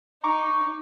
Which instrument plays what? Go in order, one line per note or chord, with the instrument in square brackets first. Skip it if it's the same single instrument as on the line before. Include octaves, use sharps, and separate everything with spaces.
[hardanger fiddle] D#4 [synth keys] A#5 C#6 D6